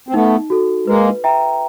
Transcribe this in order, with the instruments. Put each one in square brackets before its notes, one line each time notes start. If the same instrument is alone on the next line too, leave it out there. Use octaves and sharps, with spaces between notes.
[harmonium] C4
[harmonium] A3 B3 [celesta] D#4
[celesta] F#4 A4
[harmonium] G#3 A#3 [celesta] B4
[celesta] E5 G5 A#5